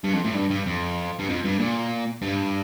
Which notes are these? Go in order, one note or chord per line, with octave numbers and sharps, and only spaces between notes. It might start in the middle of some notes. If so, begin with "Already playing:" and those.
G2
F2
A2
G2
G2
F2
G2
F2
G2
A#2
G2